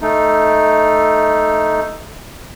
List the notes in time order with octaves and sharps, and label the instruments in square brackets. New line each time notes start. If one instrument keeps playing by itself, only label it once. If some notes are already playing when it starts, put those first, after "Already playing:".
[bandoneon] A3 D#4